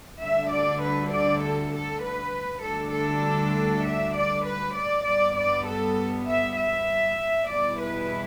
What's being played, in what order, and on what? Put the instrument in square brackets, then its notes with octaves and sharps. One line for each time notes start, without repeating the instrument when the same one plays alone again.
[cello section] D2 D3 G3 E5
D5
B4
D5
A4
A4
B4
D2 D3 G3 D4 A4
A4
E5
D5
B4
D5
G2 G3 B3 D5
D5
A4
E5
E5
E2 B2 G3 B3 E4 D5
B4